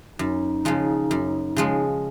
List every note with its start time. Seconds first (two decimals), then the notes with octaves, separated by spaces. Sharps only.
0.19 F#2 D#4
0.65 C#3 F3 G#3
1.11 F#2
1.56 C#3 F3 G#3